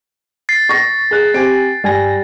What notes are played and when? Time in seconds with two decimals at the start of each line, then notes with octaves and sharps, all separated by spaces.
0.49 A6 C7
0.69 C#6 A#6
1.11 G#4 F#6
1.34 C4 G4 G#5 D7
1.84 G2 G3 G#5 A#6